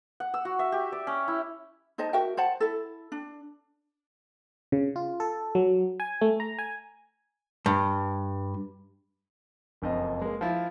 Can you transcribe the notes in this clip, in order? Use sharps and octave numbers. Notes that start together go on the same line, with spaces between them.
F#5
E6
F#4
E5
G4
D5
C#4
E4
D#4 C5 D#5 A5
F#4 A#4 E5 G5
C5 F#5 A5
E4 A4
D4
C#3
F4
A4
F#3
G#5
A3
A#5
G#5
G2
F#1 F2 D#5
G#3 A#3
F3 E4 F4